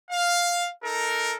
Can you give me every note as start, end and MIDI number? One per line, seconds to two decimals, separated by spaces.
0.11 0.69 77
0.84 1.37 63
0.84 1.37 69
0.84 1.37 70